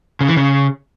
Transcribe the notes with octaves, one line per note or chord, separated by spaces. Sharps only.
C#3
E3
C#3